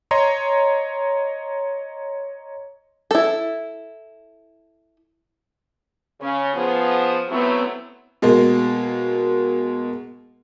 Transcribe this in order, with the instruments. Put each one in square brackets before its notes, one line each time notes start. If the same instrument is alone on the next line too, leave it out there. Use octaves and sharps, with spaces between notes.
[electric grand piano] C#5 D#5 A#5 C6
[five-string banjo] E4 A4
[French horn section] C#3 [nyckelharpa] C#4
[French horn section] F3 B3 [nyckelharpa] G#4
[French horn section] F#3 A3 E4 [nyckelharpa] B3 C4
[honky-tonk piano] B2 G#3 A#3